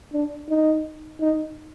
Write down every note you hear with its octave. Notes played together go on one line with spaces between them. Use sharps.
D4
D#4
D#4